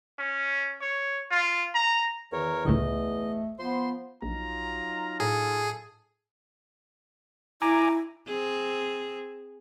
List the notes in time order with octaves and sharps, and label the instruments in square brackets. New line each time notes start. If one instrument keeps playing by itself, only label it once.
[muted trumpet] C#4
C#5
F4
A#5
[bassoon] E2 [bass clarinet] D#3 [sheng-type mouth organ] A#4 C#5
[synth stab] G1 C#2 A2 [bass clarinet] A3 [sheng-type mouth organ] D#5
[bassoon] F3 [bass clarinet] B3 [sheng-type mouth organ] C5 C6
[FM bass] A#1 [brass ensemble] F#3 D#4 F4 [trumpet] A#5
[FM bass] A2 [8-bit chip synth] G#4 [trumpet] A4
[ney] E4 [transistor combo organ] G#5 A#5 D6
[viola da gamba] C4 G#4